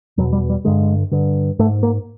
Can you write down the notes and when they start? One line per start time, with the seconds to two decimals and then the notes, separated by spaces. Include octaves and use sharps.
0.17 E2 B2 F#3
0.33 G3
0.50 G3
0.65 G2 D3 G#3
1.12 G2 D3
1.59 G#2 A3
1.83 A#3